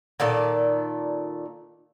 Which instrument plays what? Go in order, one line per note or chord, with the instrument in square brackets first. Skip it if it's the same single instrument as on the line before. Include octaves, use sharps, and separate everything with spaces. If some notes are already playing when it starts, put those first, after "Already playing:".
[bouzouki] A#2 D#3 A4 D5